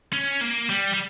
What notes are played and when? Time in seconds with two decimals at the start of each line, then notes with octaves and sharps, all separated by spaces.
0.13 C#4
0.41 A#3
0.70 G3
0.94 G3